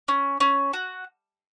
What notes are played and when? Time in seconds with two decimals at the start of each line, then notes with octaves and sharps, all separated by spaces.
0.08 C#4
0.40 C#4
0.73 F#4